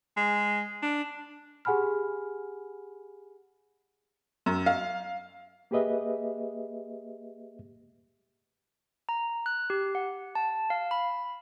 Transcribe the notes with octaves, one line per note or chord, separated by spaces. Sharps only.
G#3
D4
G4 G#4 F#5 G#5 B5 F6
F#2
F5
A#3 G4 G#4 B4 D#5 E5
A#5
F#6
G4
F#5
A5
F5
B5